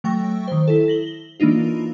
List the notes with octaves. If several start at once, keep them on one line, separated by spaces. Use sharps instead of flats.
F#3 A3 G5 C#6 E6 A#6
D#3 C5
E4 A4
A#6 F#7 G7
G7
E3 A#3 D4 D#4 F4